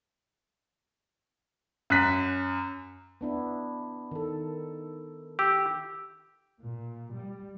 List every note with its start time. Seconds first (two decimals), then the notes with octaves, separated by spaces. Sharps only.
1.90 F#2 F#6 B6
3.21 B3 D4 E4
4.11 D#3 A4
5.39 G4 E6
6.60 A#2
7.13 G3